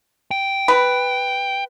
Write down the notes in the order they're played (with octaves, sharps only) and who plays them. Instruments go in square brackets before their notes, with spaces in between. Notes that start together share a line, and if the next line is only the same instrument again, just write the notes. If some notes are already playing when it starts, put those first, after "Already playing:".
[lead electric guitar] G5
[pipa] B4